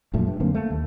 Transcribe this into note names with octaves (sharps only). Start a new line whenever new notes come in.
A#1 F#2 A#2 A3
G2
F#2 D3 A#3 C4
A3 A#3
D#2